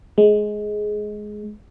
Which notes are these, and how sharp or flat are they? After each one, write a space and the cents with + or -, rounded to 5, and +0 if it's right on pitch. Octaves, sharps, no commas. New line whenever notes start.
G#3 +15